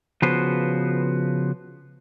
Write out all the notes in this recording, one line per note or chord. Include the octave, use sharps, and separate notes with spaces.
C#3 F3 B3 F#4 B4 C5